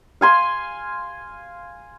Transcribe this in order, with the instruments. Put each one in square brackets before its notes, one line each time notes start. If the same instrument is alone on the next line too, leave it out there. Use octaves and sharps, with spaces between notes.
[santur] F5 G#5 C6